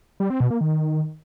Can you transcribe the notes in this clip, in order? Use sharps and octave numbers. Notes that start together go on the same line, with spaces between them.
G3
C4
B2
A#3
D#3